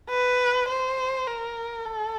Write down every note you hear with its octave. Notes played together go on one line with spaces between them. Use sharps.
B4
C5
A#4
A4